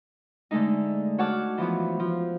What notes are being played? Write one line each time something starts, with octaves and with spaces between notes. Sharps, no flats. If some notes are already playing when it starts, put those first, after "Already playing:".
D3 G#3 A3 D#4
F#4 C#5 F#5 A5 D6 F6
E3 F3 B3
F3